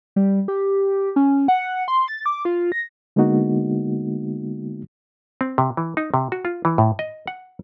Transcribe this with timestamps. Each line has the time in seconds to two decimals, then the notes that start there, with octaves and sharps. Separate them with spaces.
0.16 G3
0.48 G4
1.16 C#4
1.48 F#5
1.88 C6
2.08 A6
2.26 D6
2.45 F4
2.72 A#6
3.16 D3 G#3 A#3 B3 D#4 F#4
5.41 C4
5.58 C3
5.77 E3
5.97 D#4
6.14 C3
6.32 F#4
6.45 F4
6.65 E3
6.78 A2
6.99 D#5
7.27 F#5